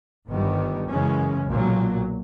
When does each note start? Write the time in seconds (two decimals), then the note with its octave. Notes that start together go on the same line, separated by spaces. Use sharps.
0.31 G1 G2 D#3 G3 B3
0.90 F#2 C#3 E3 G#3 C#4
1.48 B1 A#2 F#3